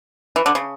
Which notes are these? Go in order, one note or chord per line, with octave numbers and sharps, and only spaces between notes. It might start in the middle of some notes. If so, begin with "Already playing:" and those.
E3
D3
C#3